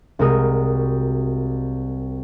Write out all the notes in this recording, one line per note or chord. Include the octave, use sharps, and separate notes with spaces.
C2 G#3 F#4 A#4 D#6